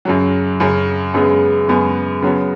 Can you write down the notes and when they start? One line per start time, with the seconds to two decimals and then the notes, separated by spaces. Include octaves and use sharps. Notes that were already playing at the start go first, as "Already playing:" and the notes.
0.05 F#2 C#3 F#3
0.60 F#2 C#3 F#3
1.14 F#2 C#3 G#3 B3 G#4
1.68 F#2 C#3 G#3 B3 G#4
2.22 C#3 F#3 B3